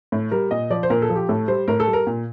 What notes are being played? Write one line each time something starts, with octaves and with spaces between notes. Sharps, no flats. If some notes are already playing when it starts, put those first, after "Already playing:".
A2
G3 A#4
A#2 D#5
F3 D5
C5
A#2 A#4
A4
F3
G4
A2 A4
G3 C5
A2 A#4
A4
G3
A#4
A#2